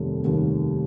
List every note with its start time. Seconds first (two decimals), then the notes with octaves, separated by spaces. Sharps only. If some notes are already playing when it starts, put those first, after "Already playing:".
Already playing: F1 D#2 D#3 G3
0.24 F1 D#2 D#3 G3 A#3